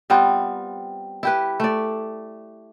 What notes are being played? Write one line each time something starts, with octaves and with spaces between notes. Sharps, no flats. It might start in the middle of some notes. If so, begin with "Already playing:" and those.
G3 B3 C4 F4
E4 G4 B4
A3 D5